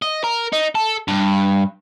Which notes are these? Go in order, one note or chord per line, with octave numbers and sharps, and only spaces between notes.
D#5
A#4
D#4
A4
G2